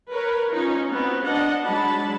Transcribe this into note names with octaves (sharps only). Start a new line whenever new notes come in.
A#4 B4 C#5
C#4 D#4 F4
B3 C4 F#4
D4 D#5 F#5 A5
F#3 G#3 D4 A5 B5